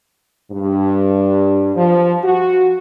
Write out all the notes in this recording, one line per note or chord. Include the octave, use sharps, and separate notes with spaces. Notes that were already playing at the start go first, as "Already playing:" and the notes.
G2
F3
F#4